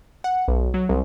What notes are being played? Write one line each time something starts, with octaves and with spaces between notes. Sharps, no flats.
F#5
B1
F#3
C2